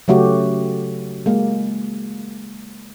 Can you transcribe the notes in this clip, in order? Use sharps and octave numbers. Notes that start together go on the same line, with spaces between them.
C#3 F#3 A3 F#4 G4
G#3 A#3